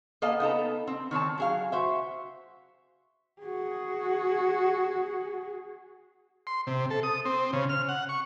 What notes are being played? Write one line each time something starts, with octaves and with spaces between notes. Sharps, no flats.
A#3 B3 A4 D#5 F5
B3 D#4 A4 A#5
C4
D#3 C4 C#5 A5
F#3 G#4 F5
F#4 C5 E5
F#4 G#4
C6
C3
A4
D#6
C4
C#3
F6
F#5
C#6